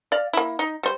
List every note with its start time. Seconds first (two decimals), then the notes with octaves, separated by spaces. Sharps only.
0.12 D5 F5
0.33 A#3 E4
0.59 D#4
0.83 G3 C5